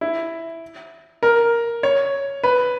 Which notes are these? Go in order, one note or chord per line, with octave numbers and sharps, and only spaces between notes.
E4
A#4
C#5
B4